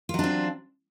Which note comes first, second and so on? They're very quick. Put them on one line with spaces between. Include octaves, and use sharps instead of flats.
F4 F#3 D4 C4